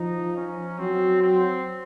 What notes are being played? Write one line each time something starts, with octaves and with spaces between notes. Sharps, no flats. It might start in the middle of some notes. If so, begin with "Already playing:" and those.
Already playing: F3 D#4
C#4
F#3 C4
C4